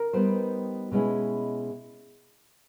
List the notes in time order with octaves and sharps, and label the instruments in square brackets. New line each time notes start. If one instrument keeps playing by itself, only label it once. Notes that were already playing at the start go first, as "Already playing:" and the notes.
Already playing: [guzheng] A#4
[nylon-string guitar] G3 B3 D#4 G4 C5
B2 G#3 C#4 E4 G#4